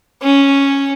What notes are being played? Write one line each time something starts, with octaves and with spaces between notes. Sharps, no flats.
C#4